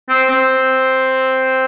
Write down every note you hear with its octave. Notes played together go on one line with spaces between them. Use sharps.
C4
C4